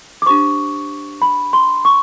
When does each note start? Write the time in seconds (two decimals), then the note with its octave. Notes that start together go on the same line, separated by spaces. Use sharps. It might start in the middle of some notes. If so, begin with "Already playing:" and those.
0.22 D6
0.26 D4 G4 C5 C#6
1.22 B5
1.53 C6
1.85 C#6